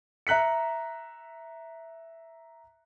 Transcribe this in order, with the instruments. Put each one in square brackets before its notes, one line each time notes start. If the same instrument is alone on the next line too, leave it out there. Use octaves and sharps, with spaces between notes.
[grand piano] E5 A#5 F#6 B6 C#7